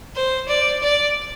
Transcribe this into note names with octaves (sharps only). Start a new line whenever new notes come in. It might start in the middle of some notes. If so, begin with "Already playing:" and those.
C5
D5
D5